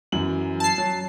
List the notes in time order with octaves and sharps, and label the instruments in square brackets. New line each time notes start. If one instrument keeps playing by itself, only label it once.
[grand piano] F#2 E3 F#7
[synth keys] A5 C7
[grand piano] F#3